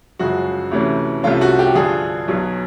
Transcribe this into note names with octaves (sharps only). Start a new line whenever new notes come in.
G1 F#2 C#3 F3 G#3 F#4
D2 C3 E3 A3 C#4
C2 C3 F3 A3 C#4 F4
F#4
G4
G2 D3 F3 G#4
B1 B2 F#3